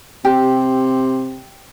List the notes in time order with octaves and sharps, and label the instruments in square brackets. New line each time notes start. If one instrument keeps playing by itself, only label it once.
[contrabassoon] C3 [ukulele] G4